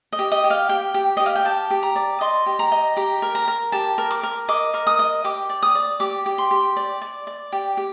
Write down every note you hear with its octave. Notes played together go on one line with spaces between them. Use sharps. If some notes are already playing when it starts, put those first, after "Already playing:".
D#5
G4
D#5
G4
F5
G4 G5
G4
G4 D#5
F5
G5
G4 A5
G4
A#5
D5
D#5 C6
G4
A#5
D#5
G4 A#5
A#4
A#5
A#4
G4 A5
A#4
D6
A#4
D#5 D6
A#4
D#6
D#5
G4 D6
D5
D#6
D5
G4 D6
G4
C6
G4
D5
D5
D5
G4
G4